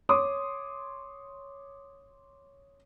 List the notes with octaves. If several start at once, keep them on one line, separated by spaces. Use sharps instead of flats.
C#5 C6 D6 D#6